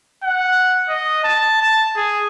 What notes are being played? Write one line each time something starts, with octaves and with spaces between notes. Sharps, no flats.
F#5
D#5
A5
A5
G#4